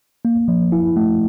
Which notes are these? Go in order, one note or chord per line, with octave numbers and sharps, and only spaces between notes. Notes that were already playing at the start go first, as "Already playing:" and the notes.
A#3
F3
E4
A3